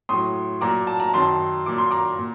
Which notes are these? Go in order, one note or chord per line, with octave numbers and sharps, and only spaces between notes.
A2 F#3 C6 D#6
A#2 F#3 A#5 D6
A5
A#5
F#2 D#3 F#3 A5 C6
A#2 F#3 D6
C6
A#5 D6
A#2